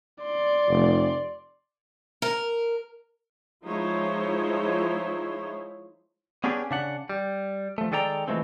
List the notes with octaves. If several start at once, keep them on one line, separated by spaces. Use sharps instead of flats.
D5 C6
F1
A#4
F3 G#3 D#4 E4 C5 C#5
B3 C#4 D4 G4 G#4
C#3 D4 F#5
G3
F3 A3
D#3 G#3 A4 D5 G5 A#5
E3 F3 G#3 A3 C4